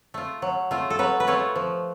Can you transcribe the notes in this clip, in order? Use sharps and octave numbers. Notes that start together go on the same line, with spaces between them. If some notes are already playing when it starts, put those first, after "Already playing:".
A3 F4
F#3
A3 F4
A4
F#3 B4
B4
A3 F4 C#5
F3